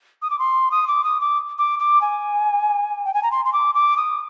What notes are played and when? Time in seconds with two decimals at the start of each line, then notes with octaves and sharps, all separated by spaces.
0.22 D#6
0.30 D6
0.39 C6
0.71 D#6
0.87 D6
1.04 D#6
1.21 D6
1.58 D6
1.79 D6
2.01 G#5
3.05 G5
3.14 G#5
3.23 A#5
3.31 C6
3.45 C6
3.53 D6
3.75 D6
3.97 D#6